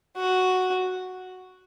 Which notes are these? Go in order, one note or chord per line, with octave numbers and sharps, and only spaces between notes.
F#4